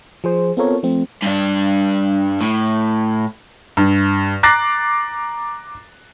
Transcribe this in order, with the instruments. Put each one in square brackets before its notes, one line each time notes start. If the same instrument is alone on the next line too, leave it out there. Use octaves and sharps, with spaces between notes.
[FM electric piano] F3 G#4 C5
B3 C4 F4 A4 A#4 C#5
F3 A3 C4
[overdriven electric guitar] G2 D4
A2
[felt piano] G2
A#5 D6 F#6 A6 A#6 C7